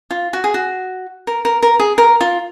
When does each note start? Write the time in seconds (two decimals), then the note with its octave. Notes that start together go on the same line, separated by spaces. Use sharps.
0.11 F4
0.33 F#4
0.44 G#4
0.54 F#4
1.27 A#4
1.45 A#4
1.63 A#4
1.80 G#4
1.98 A#4
2.21 F4